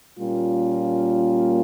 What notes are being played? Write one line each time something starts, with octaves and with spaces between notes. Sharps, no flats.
A#2 G3 A#3 C#4 F4